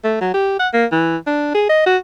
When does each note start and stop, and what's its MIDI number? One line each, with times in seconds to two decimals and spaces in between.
0.04 0.16 57
0.21 0.31 54
0.34 0.55 67
0.59 0.68 78
0.73 0.85 58
0.92 1.17 52
1.27 1.52 62
1.54 1.67 68
1.69 1.84 75
1.86 1.97 66